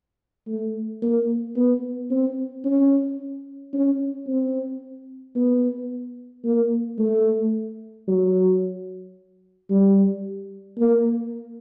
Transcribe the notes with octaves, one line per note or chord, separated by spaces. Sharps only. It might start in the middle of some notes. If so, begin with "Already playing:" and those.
A3
A#3
B3
C4
C#4
C#4
C4
B3
A#3
A3
F#3
G3
A#3